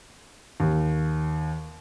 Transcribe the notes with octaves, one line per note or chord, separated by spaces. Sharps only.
D#2